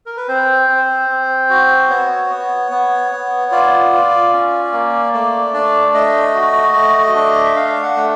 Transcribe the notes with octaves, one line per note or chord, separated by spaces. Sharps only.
A#4
B4
C4 C5
C4
C4
F#4
B3 C#5
B3
B3
B3
F4 D5
F4
C#4
A#3
A3 D5
D4 D5
A3 D#5
F#4
A3
D4
E5
D4 F5
F#5
A3